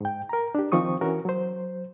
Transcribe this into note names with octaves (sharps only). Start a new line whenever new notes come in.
G#2 G5
A#4 A#5
D4 G4
D#3 F3 C4 C#6 D#6
E3 C#4 F#4 A#4
F#3 C5